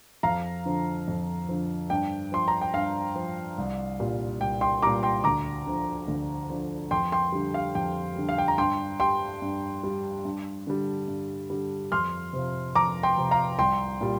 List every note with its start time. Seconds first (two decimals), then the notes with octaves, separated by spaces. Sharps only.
0.23 F2 F5 A#5
0.65 D3 F3
1.08 F2
1.49 D3 F3
1.90 G2 G5
2.32 F3 C6
2.48 A#5
2.61 G5
2.73 G2 F5
3.16 F3
3.58 C2
4.00 A#2 G3
4.41 C2 G5
4.61 G5 C6
4.82 A#2 G3 A#5 D6
5.03 G5 C6
5.24 D2 A#5 D6
5.66 D3 F3
6.08 D2
6.50 D3 F3
6.91 F2 G5 C6
7.12 G5 C6
7.32 D3 G3
7.54 F5
7.75 F2 G5
8.16 D3 G3
8.29 F5
8.38 G5
8.48 A#5
8.58 G2 G5 C6
9.00 G3 G5 C6
9.42 G2
9.84 G3
10.25 G2
10.67 D3 G3
11.08 G2
11.50 D3 G3
11.92 F2 C6 F6
12.33 C3 F3
12.75 F2 A#5 D6
13.03 G5 C6
13.18 C3 F3
13.31 F5 A#5
13.59 C2 G5 C6
14.01 A#2 G3